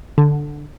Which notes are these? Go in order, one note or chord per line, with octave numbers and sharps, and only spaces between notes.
D3